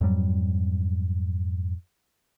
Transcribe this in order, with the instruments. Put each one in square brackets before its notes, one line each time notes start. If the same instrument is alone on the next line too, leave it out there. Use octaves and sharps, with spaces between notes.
[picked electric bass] F2 G#2 F#3 G3